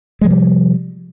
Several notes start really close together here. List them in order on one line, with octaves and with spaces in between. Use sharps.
G#3 F3 C3 G3